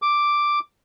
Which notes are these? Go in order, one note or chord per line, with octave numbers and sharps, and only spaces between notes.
D6